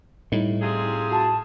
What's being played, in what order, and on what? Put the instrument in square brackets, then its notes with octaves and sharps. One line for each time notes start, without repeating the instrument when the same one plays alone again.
[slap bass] A2 [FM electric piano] G3 D#4 E4
[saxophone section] C3 F4 G#4
[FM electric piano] F#4 [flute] A5